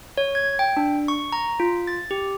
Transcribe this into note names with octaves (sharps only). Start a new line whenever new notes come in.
C#5
G#6
G5
D4
C#6
A#5
F4
A6
G4